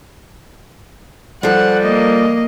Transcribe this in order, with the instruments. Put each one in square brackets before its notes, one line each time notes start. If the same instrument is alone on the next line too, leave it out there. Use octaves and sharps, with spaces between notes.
[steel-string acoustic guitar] F3 A4 [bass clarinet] G3 [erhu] F#5
[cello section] A#3 [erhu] D#5